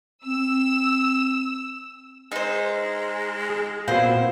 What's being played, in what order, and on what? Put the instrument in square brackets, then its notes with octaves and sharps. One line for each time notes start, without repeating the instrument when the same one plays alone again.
[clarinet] C4 [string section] E6
[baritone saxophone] G#3 [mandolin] D#4 C5
[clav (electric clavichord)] G#4
[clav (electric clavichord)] A#2 B3 C4 [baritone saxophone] E4 [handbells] F#4 F5 [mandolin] C5